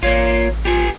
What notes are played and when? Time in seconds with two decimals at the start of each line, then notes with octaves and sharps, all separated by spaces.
0.03 A1 A#3 F4 C#5
0.65 F4 G4 B4 G#5